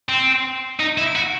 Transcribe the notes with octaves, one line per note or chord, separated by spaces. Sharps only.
C4
D#4
E4
F#4